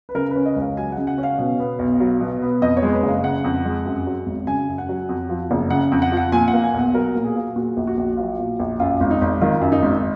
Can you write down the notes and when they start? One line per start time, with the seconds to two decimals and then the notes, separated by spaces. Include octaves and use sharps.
0.09 B4
0.15 C#3 A#4
0.31 C#4 B4
0.46 D#5
0.56 C#2
0.61 F5
0.77 F#3 G#5
0.92 C#3 F#5
1.07 F#5
1.18 C#4
1.23 F5
1.38 B2
1.59 B3
1.79 B1
2.00 F#3
2.21 B2
2.42 B3
2.62 F2 D#5
2.77 C#5
2.82 G#3
2.93 B4
3.03 F#1 F5
3.24 C#3 F#5
3.44 F2
3.65 G#3
3.85 F#2
4.06 F#3
4.26 G#1
4.47 C#3 G#5
4.68 F#2
4.78 F#5
4.89 F#3
5.09 F2
5.29 F3
5.51 F#1
5.70 C#3 F#5
5.92 F2
6.02 F#5
6.12 F3
6.17 F#5
6.32 A#2 G#5
6.48 F#5
6.53 A#3
6.64 G#5
6.74 B1
6.79 F#5
6.94 F#3 A#4
7.15 A#2
7.25 G#4
7.36 A#3
7.56 A#2 F#4
7.77 A#1
7.87 F#4
7.97 A#1
8.17 F#3 F4
8.39 A#2
8.59 A#1
8.80 F#2 F4
9.00 G#1
9.11 D#4
9.21 G#1
9.41 D#3 F4
9.61 F#2
9.72 D#4
9.82 G#1